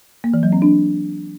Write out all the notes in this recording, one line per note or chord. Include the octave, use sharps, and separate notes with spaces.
A#3
E3
F#3
C4
D4